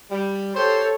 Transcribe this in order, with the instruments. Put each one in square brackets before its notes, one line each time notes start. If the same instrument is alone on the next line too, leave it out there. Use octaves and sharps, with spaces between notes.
[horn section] G3
[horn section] G4 C5 [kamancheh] A4 C#5